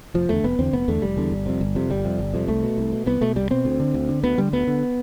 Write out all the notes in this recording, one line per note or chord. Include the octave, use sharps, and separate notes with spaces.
F1 F3
E2 D3 A3
F1 B3
E2 D3 C4
F1 B3
E2 D3 A3
F1 G3
E2 D3
G1
F2 C3
G1
F2 C3
G1 G3
F2 C3
G1
F2 C3
C2 A3
B2
C2
B2
C2 B3
B2 A3
C2 G3
B2 C4
D2
D3
D2
D3
D2 B3
D3 G3
D2 B3
D3